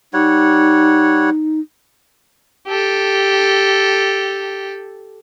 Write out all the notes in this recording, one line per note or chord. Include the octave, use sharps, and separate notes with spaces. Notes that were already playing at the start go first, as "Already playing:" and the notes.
G3 D#4 C#5 F#5
G4 A4